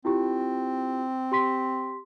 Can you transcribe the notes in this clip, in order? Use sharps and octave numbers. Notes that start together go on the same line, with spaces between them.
C4 E4 F4 G4
G4 C6 B6